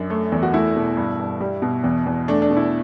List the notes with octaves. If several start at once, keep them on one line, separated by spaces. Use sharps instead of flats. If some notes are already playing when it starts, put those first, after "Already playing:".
Already playing: F#2 D4
A3
E2
F#4
A3 E4
B2
G2
G2
G3
B2
E2
E2
A3 D4
D4
B2
E4